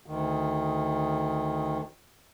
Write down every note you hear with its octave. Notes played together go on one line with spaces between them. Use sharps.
D2 D#3